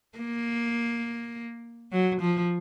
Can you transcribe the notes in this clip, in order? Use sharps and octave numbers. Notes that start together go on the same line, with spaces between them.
A#3
F#3
F3